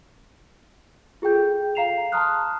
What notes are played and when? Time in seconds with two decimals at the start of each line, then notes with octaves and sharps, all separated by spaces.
1.22 F4 G#4 A4 G5 G6
1.75 F5 A#5 C7 E7 F7
2.12 A5 A#5 C6 D#6 F6 F#6